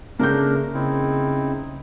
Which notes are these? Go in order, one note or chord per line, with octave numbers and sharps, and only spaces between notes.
C#3 A3 A#3 D4 A#4 G6
C#3 C4 D#4 E4